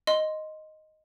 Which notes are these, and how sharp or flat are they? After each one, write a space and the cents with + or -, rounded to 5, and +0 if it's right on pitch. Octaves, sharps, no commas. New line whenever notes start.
D#5 +0 C6 +0